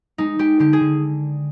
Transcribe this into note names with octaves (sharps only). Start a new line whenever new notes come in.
G#3 D#4
G#3 G4
D3 G4
G#4
D3